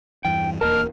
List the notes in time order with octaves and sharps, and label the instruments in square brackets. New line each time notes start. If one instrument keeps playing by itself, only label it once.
[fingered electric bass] E2 G2 E3 [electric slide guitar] G5
[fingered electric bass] D#1 E2 A#3 [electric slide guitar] D3 D#5 A5 [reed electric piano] A#4 [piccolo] F6